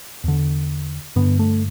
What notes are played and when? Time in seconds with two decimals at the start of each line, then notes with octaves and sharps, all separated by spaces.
0.24 E2 D3
1.16 G2 D3 B3
1.39 A3